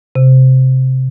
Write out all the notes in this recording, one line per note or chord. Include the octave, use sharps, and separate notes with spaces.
C3